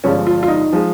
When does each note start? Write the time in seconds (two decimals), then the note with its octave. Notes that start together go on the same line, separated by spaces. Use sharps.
0.04 G1 G2 F3 G#3 C#4
0.27 F4
0.43 F4
0.48 D#4
0.73 F3 G#3